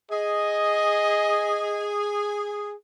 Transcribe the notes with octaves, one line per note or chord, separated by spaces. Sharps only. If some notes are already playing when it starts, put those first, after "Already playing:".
G#4 D#5